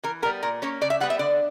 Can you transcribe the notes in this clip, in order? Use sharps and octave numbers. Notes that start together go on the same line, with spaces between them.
E3 A#4
G3 B3 A#4
A#2 A#4
A#3 C#4 C#5
C#3 D5
E5
G3 B3 F#5
E5
D3 D5